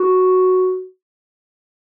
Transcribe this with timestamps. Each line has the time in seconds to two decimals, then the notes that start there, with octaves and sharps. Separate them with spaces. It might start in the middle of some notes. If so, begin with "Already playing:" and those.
Already playing: F#4